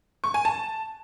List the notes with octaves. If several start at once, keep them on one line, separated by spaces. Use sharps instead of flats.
C#6
G#5
A5